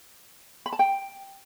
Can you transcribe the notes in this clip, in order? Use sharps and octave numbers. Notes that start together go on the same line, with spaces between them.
B5
A5
G5